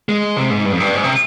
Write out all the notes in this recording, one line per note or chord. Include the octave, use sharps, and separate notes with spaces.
G#3
C3
G#2
G2
F2
G2
G#2
C3